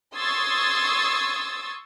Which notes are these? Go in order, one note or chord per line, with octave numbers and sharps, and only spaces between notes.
C6 C#6 D#6 E6 G#6 A6